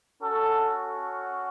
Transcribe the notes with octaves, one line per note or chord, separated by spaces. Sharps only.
C#4 F#4 A4